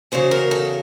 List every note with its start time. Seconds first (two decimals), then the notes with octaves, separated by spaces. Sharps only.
0.12 E2 C#3 F#3 C5
0.31 A#4
0.51 A4